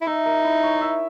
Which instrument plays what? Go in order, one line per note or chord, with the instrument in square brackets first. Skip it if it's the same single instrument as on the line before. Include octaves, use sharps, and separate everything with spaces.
[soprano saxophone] E4
[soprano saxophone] D#4 [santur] E5
[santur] A#4
E4
C#5
E5